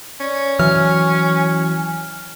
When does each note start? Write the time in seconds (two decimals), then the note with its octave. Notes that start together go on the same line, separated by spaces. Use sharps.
0.20 C#4 D5
0.59 E3 F#3 G#5 F6